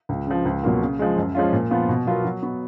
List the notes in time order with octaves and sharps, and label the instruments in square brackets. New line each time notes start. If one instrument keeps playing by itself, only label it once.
[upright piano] C#2
C#3 F3
C#2
B2 F#3 A#3 F4
C#3
F3 G#3
F#2
F3 G#3 C#4 F4
A#2
F3 B3 F4
B2
F#3 B3 F4 A#4
F#3
B3 F#4